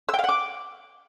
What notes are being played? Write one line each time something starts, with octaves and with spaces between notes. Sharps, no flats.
E6
G5
F5
F#5
D6